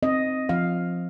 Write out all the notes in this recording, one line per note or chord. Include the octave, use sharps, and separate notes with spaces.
C4 D#5
F3 F5